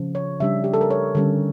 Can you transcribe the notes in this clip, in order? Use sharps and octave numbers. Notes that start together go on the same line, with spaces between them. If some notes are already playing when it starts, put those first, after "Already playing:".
Already playing: C#3 F3
C#5
C#3 G3 D4 E5
G4
A4
A#4
C#5
D3 G3 C#4